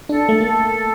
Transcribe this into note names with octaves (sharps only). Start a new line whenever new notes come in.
D4 A4
A3
A#3 A4